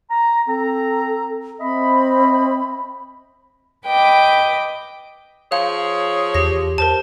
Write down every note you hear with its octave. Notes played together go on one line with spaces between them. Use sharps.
A#5
C4 A4 A#5
C4 D#5 E5 B5
B4 D#5 G5 D6
F3 G#4 C#5 F5
E2 G4 A#6
A#4 C5 A5